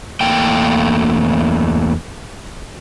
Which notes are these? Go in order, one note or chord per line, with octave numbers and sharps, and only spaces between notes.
E2 A3 A#3 G5